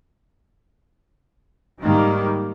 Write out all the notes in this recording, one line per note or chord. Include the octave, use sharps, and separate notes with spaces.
G#2 D#3 G3 A#3